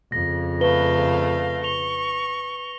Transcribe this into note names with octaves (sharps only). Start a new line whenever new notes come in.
F2 C#3 A#6
A3 B4 F5 G7
C#6 F7 G7